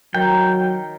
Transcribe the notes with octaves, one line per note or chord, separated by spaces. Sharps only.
D#3 F#3 G5